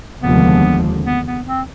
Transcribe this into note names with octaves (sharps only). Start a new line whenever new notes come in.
F1 D#2 D3 F3 G#3 B3
B3
B3
C4